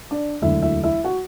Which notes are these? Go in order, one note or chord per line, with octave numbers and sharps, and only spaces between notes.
D4 D5
E1 D2 D3 F#3 E4 E5
E4 E5
E4 E5
F#4 F#5